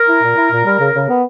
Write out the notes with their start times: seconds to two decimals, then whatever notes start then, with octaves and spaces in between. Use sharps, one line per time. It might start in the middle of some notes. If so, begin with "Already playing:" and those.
Already playing: A#4
0.08 E4
0.23 A#2
0.37 E4
0.52 A#2
0.65 G3
0.80 C#3
0.94 C#3
1.09 B3